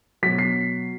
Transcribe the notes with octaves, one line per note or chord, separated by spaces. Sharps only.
B2 F#3 B6
C7